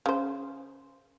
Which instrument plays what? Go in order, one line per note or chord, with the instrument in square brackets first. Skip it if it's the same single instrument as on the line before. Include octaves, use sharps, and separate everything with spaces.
[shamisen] C#3 C5